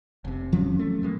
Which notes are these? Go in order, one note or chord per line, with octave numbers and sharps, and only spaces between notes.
F1 C3
F3 F#3 C#4
A3
A2 G#3 A#3